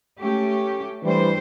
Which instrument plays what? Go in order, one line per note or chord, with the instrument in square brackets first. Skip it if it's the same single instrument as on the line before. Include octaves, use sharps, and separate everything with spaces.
[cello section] A3 C#4 G4
[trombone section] E3 G3 [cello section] A3 D4 C5